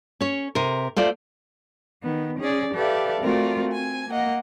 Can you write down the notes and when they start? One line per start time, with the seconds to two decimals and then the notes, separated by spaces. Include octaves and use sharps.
0.21 C#4 C#5
0.55 C3 A#4
0.96 A3 F4 C5 D5
2.04 D#3 B3
2.40 C#4 G#4 D5
2.74 G4 A4 B4 D5 E5 F5
3.22 A3 C4 F4 F#4 A#4 D5
3.71 C4 G#5
4.10 A#3 D#5 F#5